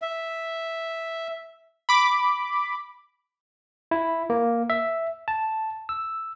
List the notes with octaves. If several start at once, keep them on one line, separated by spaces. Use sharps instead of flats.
E5
B5 D6
E4
A#3
E5
A5
E6